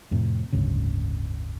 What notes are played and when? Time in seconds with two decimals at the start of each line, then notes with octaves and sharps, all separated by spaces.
0.11 F2 A2 C3
0.53 F#1 D2 G#2 C#3